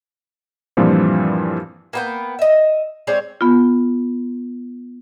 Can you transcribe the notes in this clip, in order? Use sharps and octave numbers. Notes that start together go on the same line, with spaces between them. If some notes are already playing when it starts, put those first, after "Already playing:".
G2 A#2 E3 F3 G3 C4
A#3 B3 G5
D#5 E5
G#3 C4 C#5 D5
B3 F4